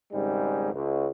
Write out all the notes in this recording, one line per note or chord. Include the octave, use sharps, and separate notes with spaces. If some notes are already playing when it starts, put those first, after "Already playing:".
G#1 G#2 C#3 G3 G#3
C#2